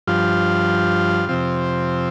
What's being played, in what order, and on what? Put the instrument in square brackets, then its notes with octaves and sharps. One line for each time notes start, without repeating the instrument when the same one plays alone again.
[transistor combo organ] G2 F3 F4
F2 C3 F3 C4